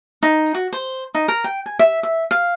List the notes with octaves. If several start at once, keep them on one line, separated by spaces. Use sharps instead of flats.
D#4
F#4
C5
D#4
A#4
G5
G#5
E5
E5
F5